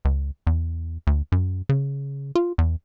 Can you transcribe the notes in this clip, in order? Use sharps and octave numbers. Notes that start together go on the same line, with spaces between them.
C#2
E2
D2
F#2
C#3
F4
E2